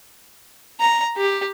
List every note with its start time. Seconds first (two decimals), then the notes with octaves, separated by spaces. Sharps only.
0.80 A#5
1.17 G4